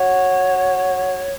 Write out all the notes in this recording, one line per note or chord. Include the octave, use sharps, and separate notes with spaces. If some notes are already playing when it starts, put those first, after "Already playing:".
Already playing: F#4 C#5